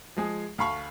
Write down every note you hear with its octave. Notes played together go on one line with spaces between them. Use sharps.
F3 G#3 G#4
D2 F5 A5 B5 C#6